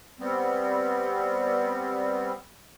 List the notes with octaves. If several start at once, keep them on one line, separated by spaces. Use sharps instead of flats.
G3 B3 C4